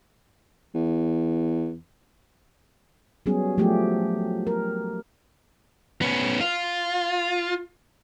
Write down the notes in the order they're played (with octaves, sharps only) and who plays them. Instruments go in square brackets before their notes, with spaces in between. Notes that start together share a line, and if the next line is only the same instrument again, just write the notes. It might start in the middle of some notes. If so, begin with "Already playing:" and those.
[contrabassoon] E2
[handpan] F#3 G3 B3 C#4 G#4
F3 F#3 A3 G4
A#4
[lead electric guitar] B3 C#4
F4